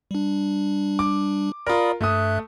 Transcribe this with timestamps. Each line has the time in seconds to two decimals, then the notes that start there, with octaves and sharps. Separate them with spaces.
0.11 G3 D4
0.99 D6
1.66 F4 A#4 D5 B5 D#6
2.01 G2 A3 E5 D#6 F#6